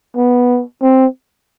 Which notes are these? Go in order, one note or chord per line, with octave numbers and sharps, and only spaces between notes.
B3
C4